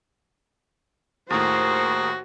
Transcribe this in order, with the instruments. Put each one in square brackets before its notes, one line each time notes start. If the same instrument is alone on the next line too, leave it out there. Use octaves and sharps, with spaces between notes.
[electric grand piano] D#2 A2 [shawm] F#4 [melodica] G#4 A#4 [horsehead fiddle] C5